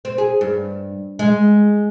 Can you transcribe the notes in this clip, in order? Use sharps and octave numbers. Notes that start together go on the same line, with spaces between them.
C4
G#4
G2
G#3